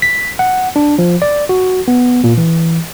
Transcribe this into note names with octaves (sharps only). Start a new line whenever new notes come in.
B6
F#5
D4
F3
D5
F#4
B3
A#2
E3